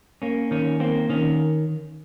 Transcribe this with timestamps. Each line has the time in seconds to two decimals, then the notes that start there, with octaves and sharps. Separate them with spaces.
0.22 A#3 C#4
0.51 D#3 C#4
0.80 A#3 C4
1.10 D#3 C#4